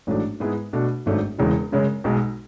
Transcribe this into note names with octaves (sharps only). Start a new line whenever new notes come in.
A1 G#2 F#3 A3 D4
G#2 G#3 B3 E4 G#4
B2 A3 D4 F#4
G#1 G#2 F#3 A3 D4
E1 E2 C#3 E3 G#3
F#2 C#3 G#3 C#4
B1 B2 G#3